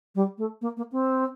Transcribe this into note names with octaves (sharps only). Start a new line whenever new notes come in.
G3
A3
A#3
A#3
C4